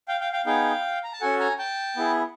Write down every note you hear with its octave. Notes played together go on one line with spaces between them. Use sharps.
F5 G5
F5 G5
F5 G5
B3 D#4 G#4 F5 G5
A#5
A5
C#4 F#4 A4 F#5 G#5
G#5 A#5
G5 A5
B3 E4 G#4